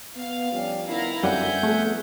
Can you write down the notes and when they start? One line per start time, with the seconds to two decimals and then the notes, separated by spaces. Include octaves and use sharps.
0.16 B3 F5
0.52 F3 G3 C#4
0.88 D#3 B3 E4 F5 A#5
1.23 F#2 D3 G3 C4 E5 F#5 G#5 G6
1.63 F3 A3 B3 G#4